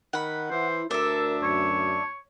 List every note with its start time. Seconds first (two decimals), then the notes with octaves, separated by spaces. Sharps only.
0.13 D#3 F#5 B5
0.51 E3 E4 C5
0.91 D2 D4 A4 A#4 E5
1.43 F#2 C#5